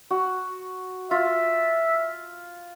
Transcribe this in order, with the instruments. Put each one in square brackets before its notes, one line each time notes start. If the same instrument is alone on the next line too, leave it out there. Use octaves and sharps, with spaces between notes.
[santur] F#4
[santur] F4 [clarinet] E5